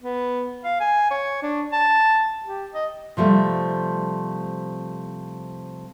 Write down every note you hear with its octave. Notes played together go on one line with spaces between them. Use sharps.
B3
F5
G#5
C#5
D4
A5
G4
D#5
C3 F3 G3 A3